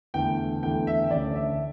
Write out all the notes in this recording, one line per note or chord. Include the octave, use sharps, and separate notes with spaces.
E2 D3 A3 G5
E2 D3 A3 G5
E5
D2 D3 A3 C#4 D5
E5